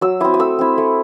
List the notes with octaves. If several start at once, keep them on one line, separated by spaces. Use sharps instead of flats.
F#3 E6
C4 E4 D#6
D#6
A3 E6
C4 E4
A3